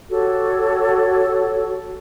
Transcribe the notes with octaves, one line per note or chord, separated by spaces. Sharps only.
F#4 G4 A4 C#5